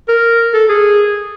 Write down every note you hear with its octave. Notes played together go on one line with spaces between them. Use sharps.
A#4
A4
G#4